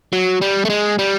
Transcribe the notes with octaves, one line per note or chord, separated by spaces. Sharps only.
F#3
G3
A3
G#3
G3